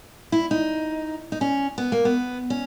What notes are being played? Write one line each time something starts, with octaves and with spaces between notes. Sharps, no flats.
E4
D#4
D#4
C#4
B3
A#3
B3
C#4